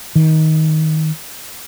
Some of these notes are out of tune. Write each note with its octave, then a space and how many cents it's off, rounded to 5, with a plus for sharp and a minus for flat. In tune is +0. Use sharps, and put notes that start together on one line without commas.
D#3 +15